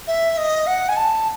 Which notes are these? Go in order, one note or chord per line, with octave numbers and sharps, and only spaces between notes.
E5
D#5
F#5
G#5
A5